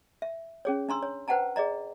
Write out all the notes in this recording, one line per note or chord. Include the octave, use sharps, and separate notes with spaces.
E5
C#4 G#4 C#5
D4 A#5 C6 E6
C#5
B4 C5 F#5 G5 A5 A#5
G#4 D5 D#5 A#5